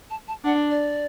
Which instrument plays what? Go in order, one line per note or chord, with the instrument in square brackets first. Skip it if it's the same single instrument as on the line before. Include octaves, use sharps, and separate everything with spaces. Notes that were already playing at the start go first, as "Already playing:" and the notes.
[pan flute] A5
A5
[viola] D4 [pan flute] F#5
[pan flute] D5